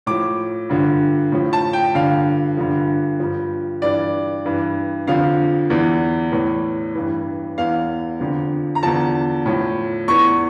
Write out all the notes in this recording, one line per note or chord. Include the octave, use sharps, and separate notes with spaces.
A2 F3 D6
G2 D3 F3
A2 F3
A5
G5
G2 D3 F3 F5
G2 D3 F3
G2 F3
G2 E3 D5
G2 E3
F2 D3 F3 F5
E2 E3
A2 E3
G2 E3
E2 E3 F5
F2 D3 F3
A#5
E2 D3 F3 A5
A2 F3
E2 E3 C#6